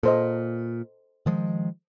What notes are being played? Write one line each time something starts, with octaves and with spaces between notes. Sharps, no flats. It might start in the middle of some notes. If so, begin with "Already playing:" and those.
A#2 A4 C5 D#5
D#3 F3 G#3